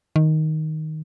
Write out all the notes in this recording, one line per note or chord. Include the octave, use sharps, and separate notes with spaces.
D#3